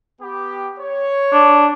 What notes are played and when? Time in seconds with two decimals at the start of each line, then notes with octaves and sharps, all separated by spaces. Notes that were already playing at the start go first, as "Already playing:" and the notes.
0.21 B3 G4
0.79 C#5
1.32 D4